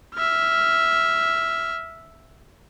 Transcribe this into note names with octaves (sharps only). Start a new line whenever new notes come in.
E5 F6